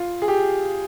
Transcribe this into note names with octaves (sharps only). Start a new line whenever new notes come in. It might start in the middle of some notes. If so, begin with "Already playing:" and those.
Already playing: F4
G#4
G4